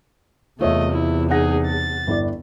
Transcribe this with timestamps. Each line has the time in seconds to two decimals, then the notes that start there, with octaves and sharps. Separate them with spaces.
0.60 E2 C3 A3 F4 C#5 D#5 E5
0.92 E4
1.31 D#4 G#4 F#5 A#6
1.68 A6
2.07 G1 E4 D5